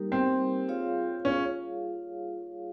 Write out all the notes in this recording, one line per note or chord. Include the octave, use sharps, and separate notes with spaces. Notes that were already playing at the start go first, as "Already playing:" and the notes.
Already playing: G3 A#3 D#4 G4 A#4
C4
F4 G#4 C#5 F5
C#4